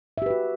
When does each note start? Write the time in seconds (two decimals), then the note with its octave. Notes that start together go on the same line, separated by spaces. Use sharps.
0.18 E5
0.22 G4
0.26 B4
0.30 F#4